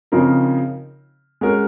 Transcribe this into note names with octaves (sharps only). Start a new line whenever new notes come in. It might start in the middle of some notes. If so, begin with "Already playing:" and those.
C#3 F3 C4 D#4 A#4
G#3 C#4 F#4 A#4